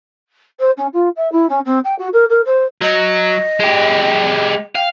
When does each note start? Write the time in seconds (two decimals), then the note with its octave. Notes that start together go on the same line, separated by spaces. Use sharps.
0.59 C5
0.77 C#4
0.93 F4
1.16 E5
1.32 E4
1.49 C#4
1.65 C4
1.84 G5
1.98 F#4
2.13 A#4
2.29 A#4
2.45 C5
2.82 F#3 D#5
3.60 G#3 G4
4.75 F5 G5